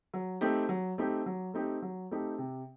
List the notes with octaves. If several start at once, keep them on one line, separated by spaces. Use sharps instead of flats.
F#3
A3 C4 D#4 G4
F#3
A3 C4 D#4 G4
F#3
A3 C4 D#4 G4
F#3
A3 C4 D#4 G4
C3